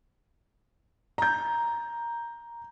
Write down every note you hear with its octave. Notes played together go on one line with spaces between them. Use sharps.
A#5 G6